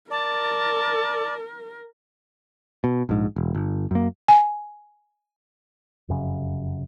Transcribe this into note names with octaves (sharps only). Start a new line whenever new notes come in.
A#4 D5 A5
B2
A#1 G#2
E1
G1
F#2 A#3
G#5
F1 F#2 C#3